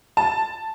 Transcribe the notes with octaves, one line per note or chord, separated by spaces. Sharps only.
A5